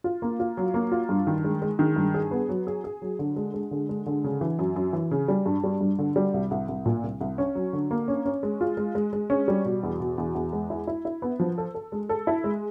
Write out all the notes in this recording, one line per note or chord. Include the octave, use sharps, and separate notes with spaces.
F4
A#3
F4
F#3
A#3
F4
G2
D#3
G#3
G#3
D#3
G2
G#4
B3
F#3
G#4
G#4
F#3
D3
G#3
G#3
D3
G#3
D3
C#3
E3
F#2
F#2
E3
C#3
G3
G2
G3
G2
D3
G3
C2
C2
C2
A#2
C2
C2
C#4
F#3
D3
A#3
C#4
C#4
G#3
F4
G#3
G#3
G#3
C#4
G3
B2
E2
B2
E2
E2
G#3
E4
E4
E4
B3
F3
A4
A4
G#3
A4
E4
G#3